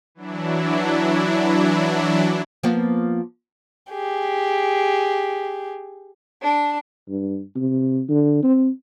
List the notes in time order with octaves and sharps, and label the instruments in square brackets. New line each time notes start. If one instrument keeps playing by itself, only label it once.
[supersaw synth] E3 F#3 D4 E4
[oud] F3 A#3 B3
[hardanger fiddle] G4 G#4
[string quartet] D4
[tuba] G2
C3
D3
C4